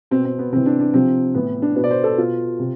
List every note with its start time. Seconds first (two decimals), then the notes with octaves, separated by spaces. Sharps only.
0.11 B2 C4
0.25 C4
0.39 B3
0.52 C3 E3 C4
0.66 D4
0.80 D4
0.94 C3 F3 C4
1.34 A2 E3 B3
1.62 D4
1.75 B2 B4
1.84 D5
1.90 C5
2.04 A4
2.17 B2 F4
2.59 C3